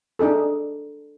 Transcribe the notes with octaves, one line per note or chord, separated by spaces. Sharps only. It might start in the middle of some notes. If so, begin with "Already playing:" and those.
D4 D#4 G#4 A4